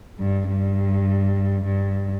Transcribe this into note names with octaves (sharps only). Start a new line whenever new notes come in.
G2
G2
G2